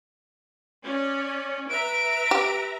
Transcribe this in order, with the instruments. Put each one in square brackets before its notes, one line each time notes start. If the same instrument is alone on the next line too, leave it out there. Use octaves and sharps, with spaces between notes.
[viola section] C#4 D5
[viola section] B4 E5 A#5 [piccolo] D7
[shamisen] G4